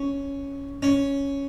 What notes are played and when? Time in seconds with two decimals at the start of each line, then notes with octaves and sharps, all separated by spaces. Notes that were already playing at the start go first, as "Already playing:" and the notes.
Already playing: C#4
0.83 C#4